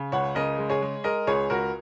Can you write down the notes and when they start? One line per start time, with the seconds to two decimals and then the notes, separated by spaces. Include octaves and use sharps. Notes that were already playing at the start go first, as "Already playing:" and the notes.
Already playing: C#3
0.12 C#2 C#5 F#5
0.35 C#3 A#4 D#5
0.58 G#3
0.70 G#4 C#5
0.82 G#3
1.04 G#3 A#4 D#5
1.27 C#2 G#4 C#5
1.50 C#2 F#4 A#4